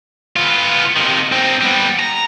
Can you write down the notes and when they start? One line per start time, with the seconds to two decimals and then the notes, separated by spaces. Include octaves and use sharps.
0.36 B3 F4
0.97 C3 D#3
1.32 C4 D#4
1.61 G3 B3
1.99 A#5